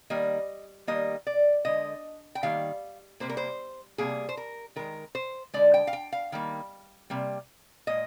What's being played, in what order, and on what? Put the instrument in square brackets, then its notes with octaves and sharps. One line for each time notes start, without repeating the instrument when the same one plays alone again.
[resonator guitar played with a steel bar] D#3 G3 A#3 D#5
D#3 G3 A#3 D#5
D5
D3 G#3 D#5
G5
D#3 G3 A#3 F5
C3 D#3 G3 A#3 C5
A#4
C5
C3 G3 A#3 G#4
C5
A#4
D#3 G#3 A#4
C5
D3 G#3 D5
G5
F5
G5
F5
D#3 G3 A#3
C3 G3 A#3
A#2 G#3 D#5